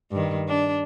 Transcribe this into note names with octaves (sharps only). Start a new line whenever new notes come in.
G2 D#3
D4